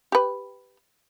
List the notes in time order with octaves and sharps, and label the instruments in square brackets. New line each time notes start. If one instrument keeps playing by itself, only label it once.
[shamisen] G4 B4